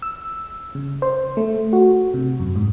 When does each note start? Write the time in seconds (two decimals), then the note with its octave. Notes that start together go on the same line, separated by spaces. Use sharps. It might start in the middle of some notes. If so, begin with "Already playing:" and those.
0.02 E6
0.75 C#3
1.02 C5
1.37 A3
1.73 F#4
2.14 C3
2.40 F#2
2.56 G#2